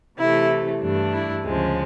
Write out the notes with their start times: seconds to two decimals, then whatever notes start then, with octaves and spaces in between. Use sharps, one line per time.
0.17 C3 E3 A3 E4
0.81 G2 E3 A3 D4
1.13 E4
1.44 D2 C#3 F3 G#3